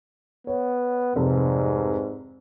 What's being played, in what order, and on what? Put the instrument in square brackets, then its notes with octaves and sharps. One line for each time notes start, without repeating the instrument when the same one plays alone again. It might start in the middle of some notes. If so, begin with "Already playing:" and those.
[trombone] B3 [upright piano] C#5
[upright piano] F1 [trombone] G#2